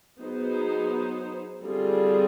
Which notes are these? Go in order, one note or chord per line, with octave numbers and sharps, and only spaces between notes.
F#3 B3 D#4 G#4 C5
D3 G3 C4 F4 G#4